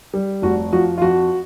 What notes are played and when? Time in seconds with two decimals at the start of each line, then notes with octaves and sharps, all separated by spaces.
0.14 G3
0.42 F1 F#4
0.73 F3 F#4
0.98 F4
1.02 F2 F#4